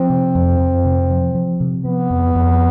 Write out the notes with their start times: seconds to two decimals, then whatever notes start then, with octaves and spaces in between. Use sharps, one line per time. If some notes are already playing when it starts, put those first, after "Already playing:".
Already playing: F3 C4
0.10 C3
0.35 F2
0.60 F2
0.85 C3
1.10 F3
1.35 F3
1.60 C3
1.85 F3 B3
2.10 F2
2.35 F2